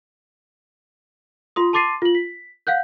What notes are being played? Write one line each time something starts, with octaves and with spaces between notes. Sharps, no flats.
F4 C6 D#6
A5 C6 D6 A6 C7 D#7
F4 F#7
B6
F5 F#5 F#6 G6